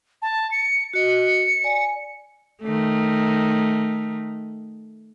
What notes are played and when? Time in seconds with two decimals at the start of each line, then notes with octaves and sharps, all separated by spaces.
0.22 A5
0.51 C#7
0.94 F#4 D#5 C#7
1.64 D5 G#5
2.62 D#3 A3